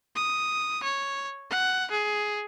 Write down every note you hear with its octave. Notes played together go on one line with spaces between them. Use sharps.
D#6
C#5
F#5
G#4